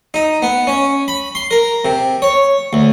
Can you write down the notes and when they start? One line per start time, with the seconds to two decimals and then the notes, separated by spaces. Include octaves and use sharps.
0.14 D#4
0.42 B3
0.67 C#4
1.08 B5
1.35 C6
1.51 A#4
1.85 C3
2.22 C#5
2.73 D2